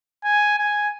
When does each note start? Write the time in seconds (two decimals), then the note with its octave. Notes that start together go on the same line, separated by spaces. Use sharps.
0.25 G#5
0.59 G#5